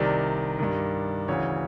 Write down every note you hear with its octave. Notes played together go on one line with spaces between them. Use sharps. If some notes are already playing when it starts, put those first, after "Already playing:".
Already playing: C2 C3 D#3 D5
G2 D#3
D2 C#3 E3 C#5